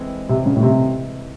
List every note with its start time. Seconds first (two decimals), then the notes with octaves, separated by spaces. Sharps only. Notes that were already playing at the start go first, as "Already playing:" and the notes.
Already playing: E3 G#3 C4 E4 A4
0.29 C3
0.46 C#3
0.56 A2
0.63 C3